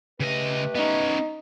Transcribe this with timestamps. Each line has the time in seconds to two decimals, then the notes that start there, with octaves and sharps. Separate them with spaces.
0.20 C#3 A3 G4 B4 D#5
0.75 B3 C#4 D#4